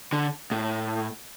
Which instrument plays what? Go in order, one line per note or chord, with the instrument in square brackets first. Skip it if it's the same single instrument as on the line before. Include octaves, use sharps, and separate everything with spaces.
[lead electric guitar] D3
A2